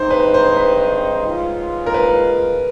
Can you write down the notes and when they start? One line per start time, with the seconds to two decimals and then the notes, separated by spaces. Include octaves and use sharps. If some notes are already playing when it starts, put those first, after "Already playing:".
Already playing: G2 D#3 G#3 C4 D#4 C5
0.10 B4
0.34 C5
0.57 B4
1.25 G#2 F3 G#3 C#4 F4
1.86 A#4
1.94 B4